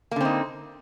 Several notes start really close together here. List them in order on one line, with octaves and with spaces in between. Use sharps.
A#3 D3 C4 D#4